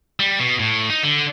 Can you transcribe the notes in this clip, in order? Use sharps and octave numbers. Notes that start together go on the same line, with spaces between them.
G3
B2
A2
D#4
D3